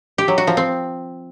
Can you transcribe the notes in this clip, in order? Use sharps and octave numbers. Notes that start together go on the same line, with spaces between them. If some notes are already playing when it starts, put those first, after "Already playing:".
G4
F#3
F#4
F3
C4